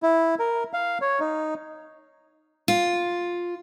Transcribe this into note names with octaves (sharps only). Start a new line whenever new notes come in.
E4
A#4
F5
C#5
D#4
F4